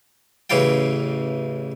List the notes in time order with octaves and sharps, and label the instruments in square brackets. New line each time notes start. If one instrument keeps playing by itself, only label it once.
[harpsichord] A1 C#3 E3 E4 F5 G5